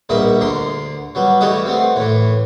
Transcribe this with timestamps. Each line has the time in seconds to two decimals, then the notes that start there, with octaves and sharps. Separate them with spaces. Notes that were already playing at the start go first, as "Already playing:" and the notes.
0.09 A#1 B2 G3 A#4 D#5 E5
0.40 D2 D3 A#5 C6
1.15 F#3 G3 B3
1.40 E3 G3 A3 F#4 G4 D#5
1.65 A3 B3 C4
1.96 A2 E3